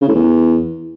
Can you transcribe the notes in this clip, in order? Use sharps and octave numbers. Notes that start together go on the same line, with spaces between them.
C#3
A2
E2